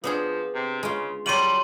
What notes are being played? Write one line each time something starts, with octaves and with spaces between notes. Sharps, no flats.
F3 B3 D4 G#4
C3
C#3 G#3 F4
F#3 G3 F4 C6 D#7 F#7